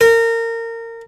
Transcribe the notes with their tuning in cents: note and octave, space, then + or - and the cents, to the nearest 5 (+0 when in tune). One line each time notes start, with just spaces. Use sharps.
A#4 -25